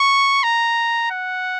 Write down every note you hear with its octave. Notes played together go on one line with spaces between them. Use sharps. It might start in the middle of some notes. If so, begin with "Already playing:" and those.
Already playing: C#6
A#5
F#5